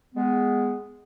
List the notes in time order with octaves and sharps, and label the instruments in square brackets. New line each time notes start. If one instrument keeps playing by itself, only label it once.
[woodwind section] G#3 B3